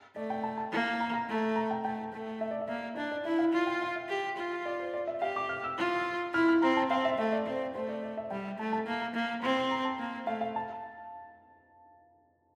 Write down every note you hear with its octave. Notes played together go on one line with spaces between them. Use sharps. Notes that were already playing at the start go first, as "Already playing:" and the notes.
A3 D5
G5
A5
A5
A#3
A#5
A#5
A3
A#5
G5
A3 G5
A3
E5
D5
E5
A#3
D4 D5
D5
E4 E5
F5
F4
G5
F5
E5
G4
F4
D5
C5
D5
E5
G4 F5
D6
F6
E6
F4
E4 F6
F6
C4 A#5
A5
C4 F5
E5
A3 E5
D5
C4 C5
A3 C5
D5
D5
E5
G3 G5
A3 A5
A5
A#3
A#5
A#3
C4 C6
C6
A#5
A5
A#3
A3 F5
F5
A5